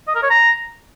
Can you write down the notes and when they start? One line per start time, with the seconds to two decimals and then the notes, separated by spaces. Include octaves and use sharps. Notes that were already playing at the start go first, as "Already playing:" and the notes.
0.08 D#5
0.15 A#4
0.23 C#5
0.30 A#5